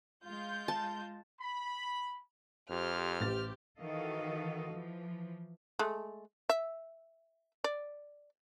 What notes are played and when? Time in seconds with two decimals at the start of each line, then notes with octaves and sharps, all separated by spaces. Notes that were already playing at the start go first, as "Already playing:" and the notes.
0.24 G#3 F4 G6
0.68 A5
1.40 B5
2.70 F2 G4 C5 F6
3.20 A1 G4 A6
3.78 D#3 E3 F#4 A4 D#5 F5
4.71 E3 F3
5.79 G#3 A3
6.49 E5
7.64 D5